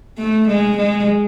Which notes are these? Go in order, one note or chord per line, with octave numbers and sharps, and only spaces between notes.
A3
G#3
G#3